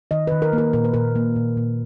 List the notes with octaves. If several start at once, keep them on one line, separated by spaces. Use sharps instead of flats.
D#3 D#5
D#3 B4
A#4
A#3
A#4
A#2 A#4
B4
A#2 A#4
A#3
A#2
A#2